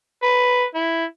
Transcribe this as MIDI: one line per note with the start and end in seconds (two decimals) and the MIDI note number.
0.23 0.65 71
0.75 1.05 64